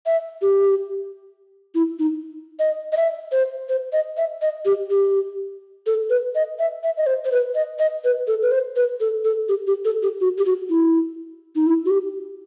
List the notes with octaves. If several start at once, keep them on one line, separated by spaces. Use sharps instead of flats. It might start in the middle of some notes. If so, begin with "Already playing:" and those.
E5
G4
E4
D#4
D#5
D#5
E5
C5
C5
D#5
E5
D#5
G4
G4
A4
B4
D#5
E5
E5
D#5
C5
C5
B4
D#5
D#5
B4
A4
B4
C5
B4
A4
A4
G4
G4
A4
G4
F#4
G4
F#4
E4
D#4
E4
F#4
G4